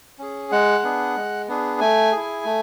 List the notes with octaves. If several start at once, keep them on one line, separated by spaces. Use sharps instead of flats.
C#4 G#4
G#3 F#5
B3 D4 G#4
G#3
B3 D4 G#4
A3 G#5
E4 G#4
A3